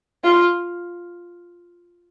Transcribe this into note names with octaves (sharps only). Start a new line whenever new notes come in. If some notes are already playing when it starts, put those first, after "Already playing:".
F4